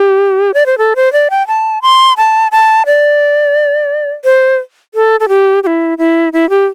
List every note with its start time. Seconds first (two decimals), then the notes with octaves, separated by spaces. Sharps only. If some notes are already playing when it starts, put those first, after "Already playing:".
Already playing: G4
0.54 D5
0.66 C5
0.78 A4
0.96 C5
1.13 D5
1.30 G5
1.47 A5
1.82 C6
2.17 A5
2.52 A5
2.86 D5
4.25 C5
4.94 A4
5.20 A4
5.28 G4
5.63 G4
5.67 E4
5.98 E4
6.33 E4
6.50 G4